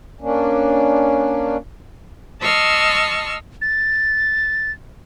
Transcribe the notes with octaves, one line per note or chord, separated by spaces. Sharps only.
A#3 C#4 D4
D#5 A5 C6 C#6 E6 F6
A6